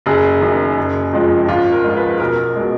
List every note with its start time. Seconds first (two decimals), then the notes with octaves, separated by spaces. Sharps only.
0.06 F#1 G#4
0.41 F#2 D#3
0.77 F#1
1.13 F2 F3 G#3
1.48 G#1 F4
1.72 A#4
1.84 G#2 F3 G#3
1.97 B4
2.20 B1 A#4
2.56 B2 G#3